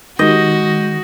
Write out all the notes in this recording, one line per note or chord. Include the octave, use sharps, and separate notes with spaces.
D#3 G#3 F#4 D#5 G6